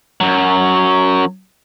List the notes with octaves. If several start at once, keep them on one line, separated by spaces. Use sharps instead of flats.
F#2 F#3